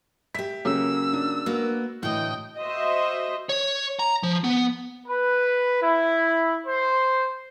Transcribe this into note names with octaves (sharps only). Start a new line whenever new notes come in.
G4 E5 B6
C#3 F#3 A#3 C#4 A4 C#5 E6
D4
A#3 B3 F#4
A2 D3 E3 D#5 G5
F#4 C5 D#5 E5
C#5
A#5
F3
B3
B4
E4
C5